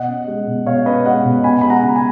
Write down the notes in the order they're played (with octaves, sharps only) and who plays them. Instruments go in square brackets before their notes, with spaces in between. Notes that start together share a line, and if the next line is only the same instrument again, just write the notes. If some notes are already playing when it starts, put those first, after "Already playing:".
Already playing: [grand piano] B2 D#5 F#5
C#4
G#3
B2
B2 C#5 F5
C#4 B4 D#5
G#3 D#5 F#5
B2
B3 G#5 B5
G#3 B5
F#5 A#5
C#3
G#5 B5